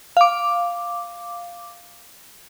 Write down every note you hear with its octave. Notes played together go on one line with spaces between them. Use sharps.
F5 D6